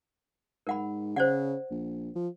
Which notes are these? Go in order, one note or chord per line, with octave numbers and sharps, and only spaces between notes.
G#2 A#4 F#5 B5
C#3 C5 D5 F#5
A#1
F3